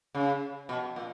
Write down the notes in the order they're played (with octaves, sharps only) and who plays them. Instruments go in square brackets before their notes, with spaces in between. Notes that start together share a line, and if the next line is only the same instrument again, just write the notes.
[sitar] C#3
B2
A#2